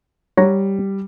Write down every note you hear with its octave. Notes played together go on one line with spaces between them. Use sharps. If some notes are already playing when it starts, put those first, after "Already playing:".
G3 C#5 F#5 A#5